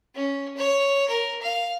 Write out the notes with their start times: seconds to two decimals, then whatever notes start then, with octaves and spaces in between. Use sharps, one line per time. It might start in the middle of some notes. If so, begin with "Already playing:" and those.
0.15 C#4
0.57 C#5
1.08 A#4
1.42 F5